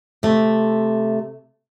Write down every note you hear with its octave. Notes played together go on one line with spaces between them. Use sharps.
C3 A3